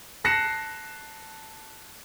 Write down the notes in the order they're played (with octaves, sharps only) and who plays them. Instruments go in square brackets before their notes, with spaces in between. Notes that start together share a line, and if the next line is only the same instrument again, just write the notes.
[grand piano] A5 F#6 A#6 C7 C#7 E7